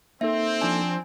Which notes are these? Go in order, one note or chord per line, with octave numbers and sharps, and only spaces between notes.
A#3 C4 D#4 A4 E5
F3 D4 G#5